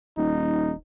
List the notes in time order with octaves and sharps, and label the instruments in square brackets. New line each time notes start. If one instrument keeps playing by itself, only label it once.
[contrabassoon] D#1 [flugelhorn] D#4